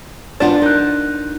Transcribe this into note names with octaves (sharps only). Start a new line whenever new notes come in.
E2 D4 F4 F#5 A6
D#4 A#4 F#6